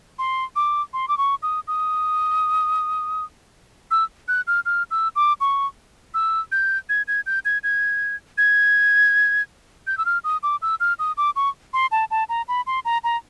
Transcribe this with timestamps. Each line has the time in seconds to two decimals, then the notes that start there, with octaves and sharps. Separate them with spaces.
0.19 C6
0.56 D6
0.93 C6
1.08 D6
1.18 C#6
1.43 D#6
1.68 D#6
3.91 E6
4.28 F#6
4.47 F6
4.66 F6
4.91 E6
5.16 D6
5.41 C#6
6.14 E6
6.52 G6
6.89 G#6
7.08 G#6
7.26 G6
7.45 G#6
7.63 G#6
8.38 G#6
9.87 G6
9.98 E6
10.05 F6
10.24 D#6
10.43 D6
10.62 E6
10.80 F6
10.99 D#6
11.17 D6
11.36 C#6
11.73 C6
11.92 A5
12.11 A5
12.29 A#5
12.48 B5
12.67 C6
12.85 A#5
13.04 A#5